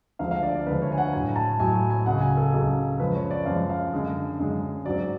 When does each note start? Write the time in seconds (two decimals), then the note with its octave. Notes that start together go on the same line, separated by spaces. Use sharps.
0.19 D2 D3 F3 G#3 F5
0.31 F5
0.43 D5
0.55 D5
0.66 D2 D3 F3 G#3 B4
0.82 C#5
0.92 G#5
0.98 F#5
1.12 A2 F#3 G#5
1.36 A5
1.60 A2 F#3 G#5
1.75 G#5
1.90 G#5
2.06 C#2 C#3 F#3 F#5
2.21 G#5
2.37 A4
2.53 C#2 C#3 F#3
2.99 F#2 F3 G#3 B4
3.15 C#5
3.31 D5
3.45 F#2 F3 G#3 F5
3.69 F5
3.93 F#2 D3 G#3
4.39 F#2 D3 G#3
4.86 G#2 F#3 D5